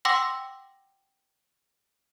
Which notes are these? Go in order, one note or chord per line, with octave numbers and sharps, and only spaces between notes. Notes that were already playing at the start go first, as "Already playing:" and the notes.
F#5 G5 C6 D6 E6 A#6